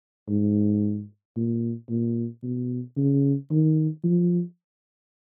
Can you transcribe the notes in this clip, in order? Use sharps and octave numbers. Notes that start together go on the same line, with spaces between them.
G#2
A#2
A#2
B2
C#3
D#3
F3